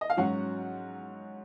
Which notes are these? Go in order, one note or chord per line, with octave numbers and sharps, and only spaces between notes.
D#5
F5
G#2 F#3 C#4 F#4 F#5